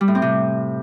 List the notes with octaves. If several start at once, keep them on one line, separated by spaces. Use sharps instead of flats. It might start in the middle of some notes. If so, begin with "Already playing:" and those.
G3
A2
C4
C3